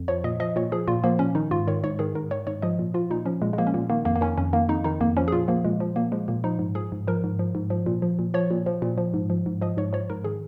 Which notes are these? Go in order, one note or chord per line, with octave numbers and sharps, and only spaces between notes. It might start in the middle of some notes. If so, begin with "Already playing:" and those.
Already playing: F2
F3 C#5
A#2 D#5
F3 D#5
A#2 C#5
F3 G#4
A#2 F4
F3 A#3
A#2 C#4
D#3 D#4
G#2 F4
D#3 C#5
G#2 C#5
D#3 G#4
G#2 A#4
D#3 C#5
G#2 C#5
F3 D#5
A#2
F3 F4
A#2 D#4
F3 C#4
A#2 G#3
G#3
F3 A#3
C#4
A#2 A#3
D#3 A#3
F2 A#3
A#3
D#3 C#4
F2 C#4
D#3 A#3
F2 D#4
D#3 D#4
F2 A#3
F3 C#4
G#4
A#2 F4
F3 A#3
A#2 G#3
F3
A#2 A#3
F3 G#3
A#2 A#3
F3 D#4
G#2
F3 G#4
G#2
F3 A#4
G#2
F3
G#2
F3
A#2
F3
A#2
F3 C#5
A#2
F3
A#2
F3
G#2
F3
G#2
F3 D#5
G#2 C#5
F3 C#5
G#2 A#4
D#3 G#4